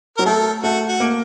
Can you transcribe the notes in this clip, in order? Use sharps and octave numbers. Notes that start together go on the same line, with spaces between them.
F#3 A#4
A3 A4
A3 F#4
F#4
A#3